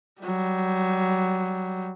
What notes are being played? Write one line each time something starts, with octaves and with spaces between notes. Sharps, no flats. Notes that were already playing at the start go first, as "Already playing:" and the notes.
F#3 G3